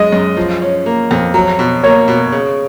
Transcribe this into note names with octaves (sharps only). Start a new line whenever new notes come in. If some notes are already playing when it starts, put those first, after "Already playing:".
Already playing: F#2 G#3 D#5
F#2
F3
C#4
A#3
F2
F#3
B2
A#3 C#5
B2
C#3